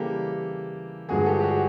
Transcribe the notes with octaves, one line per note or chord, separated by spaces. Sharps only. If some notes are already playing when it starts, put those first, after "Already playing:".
Already playing: C#3 E3 G3 A#3 G4 A4
G2 D3 F3 G#3 F#4 G#4
G4 A4
G4
F#4 G#4